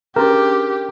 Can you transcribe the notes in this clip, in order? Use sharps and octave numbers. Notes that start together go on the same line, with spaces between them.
C#4 D4 G4 G#4 A#4